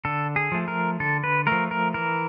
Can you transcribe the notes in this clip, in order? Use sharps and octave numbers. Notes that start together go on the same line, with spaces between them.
D3 A4
G#4
F3 A3
A#4
D3 A4
B4
F3 A3 A#4
A#4
E3 A#4